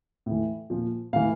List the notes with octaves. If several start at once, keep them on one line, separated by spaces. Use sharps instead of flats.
A2 E3
A#2 F3
A2 E3 F5